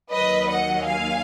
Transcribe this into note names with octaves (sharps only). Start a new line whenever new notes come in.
D#2 D#3 F#3 B4 D#5
D#5 F#5
F5 G#5